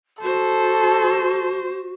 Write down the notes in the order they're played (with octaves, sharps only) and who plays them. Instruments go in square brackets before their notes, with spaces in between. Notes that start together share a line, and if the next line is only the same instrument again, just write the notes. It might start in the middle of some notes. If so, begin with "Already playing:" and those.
[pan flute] F#4 [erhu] A4 [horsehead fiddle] C5